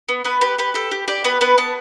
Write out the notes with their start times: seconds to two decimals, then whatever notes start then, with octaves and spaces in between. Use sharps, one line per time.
0.09 B3
0.24 B3 B4
0.41 G4 B4
0.58 G4 B4
0.74 G4 A4
0.91 G4
1.08 G4 D5
1.24 B3 B4
1.41 B3 B4
1.58 B3 A5